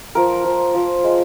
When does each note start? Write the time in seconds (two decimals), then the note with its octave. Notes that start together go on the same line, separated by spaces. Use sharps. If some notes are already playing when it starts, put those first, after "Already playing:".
0.15 F3 A#4
0.45 F3
0.75 F3
1.04 G#3